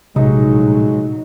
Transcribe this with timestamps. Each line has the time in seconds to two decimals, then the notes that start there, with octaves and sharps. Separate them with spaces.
0.16 A#1 A2 C3 F#3 G#3 D#4